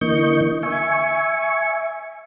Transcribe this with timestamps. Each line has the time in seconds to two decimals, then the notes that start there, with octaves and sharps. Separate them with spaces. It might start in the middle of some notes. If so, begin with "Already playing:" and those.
0.01 D3 E3 A#3 D#5 C#6 G6
0.63 E5 G#5 C#6